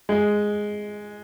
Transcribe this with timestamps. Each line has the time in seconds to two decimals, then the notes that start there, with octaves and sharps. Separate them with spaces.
0.09 G#3